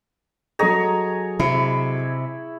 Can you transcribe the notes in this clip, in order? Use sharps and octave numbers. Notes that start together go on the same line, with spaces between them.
F#3 G#4 A4 C#5 D#5 A#5
C3 E4